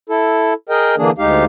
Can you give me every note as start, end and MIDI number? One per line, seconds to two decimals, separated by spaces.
0.10 0.54 64
0.10 0.54 69
0.69 0.95 68
0.69 0.95 70
0.69 0.95 75
0.69 0.95 79
0.98 1.11 50
0.98 1.11 52
0.98 1.11 58
0.98 1.11 62
0.98 1.11 68
1.18 1.45 38
1.18 1.45 56
1.18 1.45 63
1.18 1.45 67
1.18 1.45 77